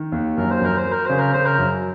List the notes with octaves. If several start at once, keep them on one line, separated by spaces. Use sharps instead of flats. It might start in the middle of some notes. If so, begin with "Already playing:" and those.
Already playing: D#3
D#2
F#2 A#4
C5
F#2 A#4
C5
F#3
A#4
C#3 C5
A#4
C#3 C5
A#4
F#2